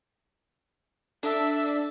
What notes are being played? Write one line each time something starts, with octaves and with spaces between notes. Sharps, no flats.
D4 A4 E5